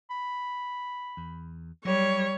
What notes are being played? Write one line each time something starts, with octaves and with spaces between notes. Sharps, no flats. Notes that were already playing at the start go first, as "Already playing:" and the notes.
B5
E2
F#3 G3 C#5